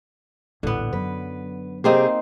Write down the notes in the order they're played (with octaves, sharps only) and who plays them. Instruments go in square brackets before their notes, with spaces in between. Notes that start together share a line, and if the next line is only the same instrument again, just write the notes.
[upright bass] D#1 A1 [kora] D3 B3
[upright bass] F#2 F#3 [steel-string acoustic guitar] B4
[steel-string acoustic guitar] C3 G4 G#4 [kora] A#3 C4 D#4